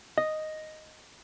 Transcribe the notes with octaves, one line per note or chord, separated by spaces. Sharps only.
D#5